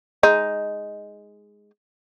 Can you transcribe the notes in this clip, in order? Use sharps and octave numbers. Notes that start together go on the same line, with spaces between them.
G#3 D#4